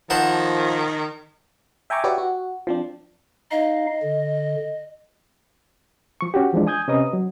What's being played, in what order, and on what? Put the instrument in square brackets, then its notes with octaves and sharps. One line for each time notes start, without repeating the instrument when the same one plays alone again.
[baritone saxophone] D#3 [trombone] F3 [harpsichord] C5 F#5 A5
[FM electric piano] E5 G5 G#5 A#5 C#6 D6
F#4 G4 B4 C#5 D5 E5
F#4
F3 C4 D4
[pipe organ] D#4 F5 [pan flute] D#5
[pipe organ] D3
[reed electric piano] F3 C#6
C#4 F#4 G4
E3 F3 G#3 D4
G#5 D#6 G6 G#6
C3 C#4 B4 D#5 A#5 D#6
F#3